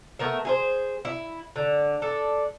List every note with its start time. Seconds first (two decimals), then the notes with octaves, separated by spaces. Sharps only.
0.19 A3 B3 A#4 E5
0.45 G#4 A4 C5
1.05 E4
1.56 D3
2.02 D4 A4